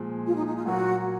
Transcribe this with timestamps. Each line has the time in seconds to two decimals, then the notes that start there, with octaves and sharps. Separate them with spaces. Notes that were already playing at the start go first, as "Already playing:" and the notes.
Already playing: A#2 F3 G#3
0.26 F4
0.36 D#4
0.46 D#4
0.56 F4
0.65 A#2 F#3 A#3 F#4